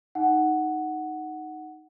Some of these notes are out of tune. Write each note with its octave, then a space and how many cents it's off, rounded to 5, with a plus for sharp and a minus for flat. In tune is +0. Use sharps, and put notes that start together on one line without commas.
D#4 +0 F#5 +5